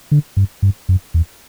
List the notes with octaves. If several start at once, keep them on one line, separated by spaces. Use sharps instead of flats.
D3
G2
G2
F#2
E2